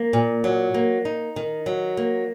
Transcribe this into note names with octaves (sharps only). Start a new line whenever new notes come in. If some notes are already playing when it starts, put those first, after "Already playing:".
Already playing: A#3
A#2
F#3
A#3
D#4
D#3
F#3
A#3